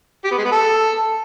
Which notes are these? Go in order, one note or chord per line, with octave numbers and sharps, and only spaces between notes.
G4
B3
G#3
B3
A4